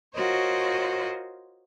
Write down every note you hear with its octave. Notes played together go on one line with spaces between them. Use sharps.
F4 F#4 A#4 C5 C#5 D#5